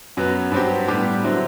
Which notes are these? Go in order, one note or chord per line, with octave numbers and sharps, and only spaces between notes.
F#2 F#3 B3
G2 F#3 C4 G4
A2 G3 B3 D4 G4
D3 F#3 C4 E4